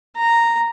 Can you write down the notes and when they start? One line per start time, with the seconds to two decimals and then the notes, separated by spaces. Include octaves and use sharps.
0.17 A#5